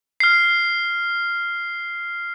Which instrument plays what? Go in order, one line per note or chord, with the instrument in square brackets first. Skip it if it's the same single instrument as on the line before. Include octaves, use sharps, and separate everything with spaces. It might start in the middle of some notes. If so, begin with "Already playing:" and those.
[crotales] F6 C7